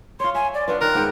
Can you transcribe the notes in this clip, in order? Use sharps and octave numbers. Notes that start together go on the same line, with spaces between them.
F4 C#5 C6
E5 G#5
D5
B3 D4 F4 B4
D#3 A#4 F#6
G#2 B3 G5